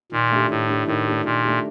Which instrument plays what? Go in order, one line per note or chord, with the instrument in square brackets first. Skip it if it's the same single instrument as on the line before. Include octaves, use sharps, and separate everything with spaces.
[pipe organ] A#2 [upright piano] D#3
[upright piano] A3 D4 G4
[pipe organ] A2 [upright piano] D#3
[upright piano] A3 D4 G4
[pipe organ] A2 [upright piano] D#3
[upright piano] A3 D4 G4
[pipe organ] A#2 [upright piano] D#3
[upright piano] A3 D4 G4